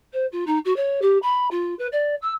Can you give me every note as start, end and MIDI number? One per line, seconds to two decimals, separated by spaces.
0.12 0.26 72
0.32 0.44 65
0.46 0.58 63
0.65 0.75 66
0.76 1.01 73
1.01 1.18 67
1.22 1.47 83
1.50 1.74 65
1.79 1.87 71
1.92 2.15 74
2.22 2.32 88